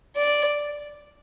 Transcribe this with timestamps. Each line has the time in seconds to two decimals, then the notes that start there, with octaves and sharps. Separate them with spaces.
0.16 D5